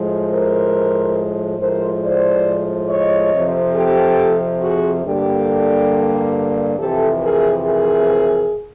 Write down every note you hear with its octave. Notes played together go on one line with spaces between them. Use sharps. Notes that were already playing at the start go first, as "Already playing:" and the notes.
Already playing: A2 F3 G#3
A#4 C5
A2 F3 G#3 A#4 C5
C5 D5
C#5 D#5
F2 C3 F3
G4 A4
F#4 G#4
G2 D3 G3 A#3 G4 A4
F2 C3 E3 G4 A4
G#4 A#4
G#4 A#4